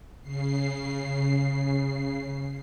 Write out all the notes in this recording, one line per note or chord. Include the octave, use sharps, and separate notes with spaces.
C#3 C7